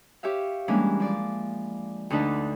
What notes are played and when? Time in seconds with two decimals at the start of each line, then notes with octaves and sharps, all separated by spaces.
0.23 G4 C#5 E5 F5
0.68 E3 G3 G#3 A#3 C#4 D4
1.00 F3 D5
2.10 D2 D3 D4 D#4 B4 A5